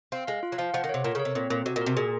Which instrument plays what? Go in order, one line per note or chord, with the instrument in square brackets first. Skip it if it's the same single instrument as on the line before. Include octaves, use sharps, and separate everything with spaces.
[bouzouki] C4 [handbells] F5
[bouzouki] G#3 [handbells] F5
[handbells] F4
[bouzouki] F#3
[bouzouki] F3 [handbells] F5
[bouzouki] F3 [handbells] F#5
[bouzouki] D#3
[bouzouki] C3 [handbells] C#5
[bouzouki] A#2 [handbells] A#4
[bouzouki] C#3
[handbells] C#5
[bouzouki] C3
[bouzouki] A#2 [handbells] C4
[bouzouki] A#2 [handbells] C4
[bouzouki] C3 [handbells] F#4
[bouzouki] A#2
[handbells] A#4
[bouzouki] C3
[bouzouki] A#2 [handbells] G#4